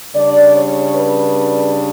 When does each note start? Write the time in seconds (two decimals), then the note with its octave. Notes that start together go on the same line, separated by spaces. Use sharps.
0.16 C#3 G3 D4 D5
0.56 C#5
0.95 B4